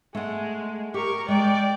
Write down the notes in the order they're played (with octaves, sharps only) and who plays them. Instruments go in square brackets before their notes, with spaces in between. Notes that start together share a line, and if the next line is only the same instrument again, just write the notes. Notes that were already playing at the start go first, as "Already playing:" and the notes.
[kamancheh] G#3 [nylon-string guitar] A3 F#5
[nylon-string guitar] G4 [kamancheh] A#4 C#6
[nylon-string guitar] G#3 [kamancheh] D5 G5